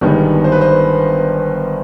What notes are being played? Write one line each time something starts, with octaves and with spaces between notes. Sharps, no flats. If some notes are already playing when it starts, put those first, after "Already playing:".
G1 G2 D#3 G#3 B3
C5
B4
C5